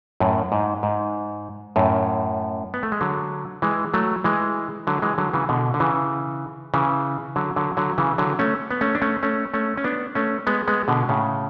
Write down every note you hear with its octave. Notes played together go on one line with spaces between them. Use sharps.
F#2 A2
G#2
G#2
F#2 A2
B3
A3
G#3
D3 F#3
E3 G#3
F#3 A3
E3 G#3
D3 F#3
E3 G#3
D3 F#3
C#3 E3
B2 D3
D3
C#3 E3
C#3 E3
D3 F#3
D3 F#3
D3 F#3
C#3 E3
D3 F#3
A3 C#4
B3
A3 C#4
D4
A3 C#4
A3 C#4
A3 C#4
C#4
B3 D4
A3 C#4
G#3 B3
G#3 B3
B2 D3
A2 C#3